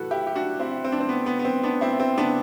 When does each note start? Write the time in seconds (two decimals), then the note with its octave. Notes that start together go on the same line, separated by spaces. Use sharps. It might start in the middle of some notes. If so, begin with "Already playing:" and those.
Already playing: A2 E3 F#4 A4 B4
0.11 E4 G4
0.27 G4
0.36 D4 F#4
0.60 C4 E4
0.85 C4
0.92 D4
1.00 C4
1.09 B3
1.26 B3
1.39 B3
1.45 C4
1.63 B3 D4
1.81 C4 E4
2.00 C4
2.18 B3 D4